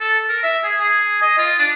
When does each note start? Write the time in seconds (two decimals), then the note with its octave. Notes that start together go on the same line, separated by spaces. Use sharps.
0.01 A4
0.29 A#4
0.43 E5
0.64 G#4
0.80 G#4
1.22 D#5
1.38 F4
1.59 D4